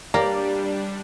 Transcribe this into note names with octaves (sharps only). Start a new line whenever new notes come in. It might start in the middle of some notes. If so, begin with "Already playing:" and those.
G3 A#3 D4 G4 D5